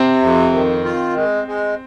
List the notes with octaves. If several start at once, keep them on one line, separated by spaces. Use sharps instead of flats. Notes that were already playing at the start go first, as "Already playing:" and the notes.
Already playing: C3 C4
F2
D#3
F4
G#3
G#3